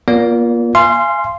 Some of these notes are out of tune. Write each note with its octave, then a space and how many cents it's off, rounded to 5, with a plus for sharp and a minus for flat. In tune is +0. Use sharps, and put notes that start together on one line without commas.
A#3 +35 F4 +0 D5 -35
F5 -35 G#5 +0 C6 +0